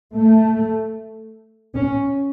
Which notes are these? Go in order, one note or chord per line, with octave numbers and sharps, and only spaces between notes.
A3
C#4